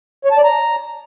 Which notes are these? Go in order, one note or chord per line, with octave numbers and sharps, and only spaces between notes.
C#5
A5
D5
A#5